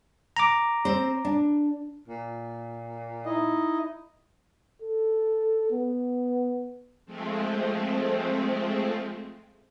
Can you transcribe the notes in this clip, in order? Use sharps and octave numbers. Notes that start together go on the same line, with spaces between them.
A#5 D6
C4 C5
D4
A#2
D#4 E4 D#5
A4
B3
F3 G#3 A3 C4